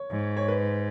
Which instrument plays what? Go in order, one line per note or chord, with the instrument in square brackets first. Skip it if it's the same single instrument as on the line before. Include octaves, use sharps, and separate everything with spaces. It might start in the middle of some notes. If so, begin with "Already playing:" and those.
Already playing: [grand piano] C#5
[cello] G#2
[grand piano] C#5
B4